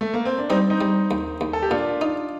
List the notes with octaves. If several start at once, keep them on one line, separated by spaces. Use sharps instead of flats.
A3
A#3
C4
D4
G3 C4 D#4
C4 D#4
G3
D#2
D#2
A4
G4
A#2 D4 F4
D#4